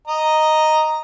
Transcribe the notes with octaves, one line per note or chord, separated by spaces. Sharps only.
D#5 A#5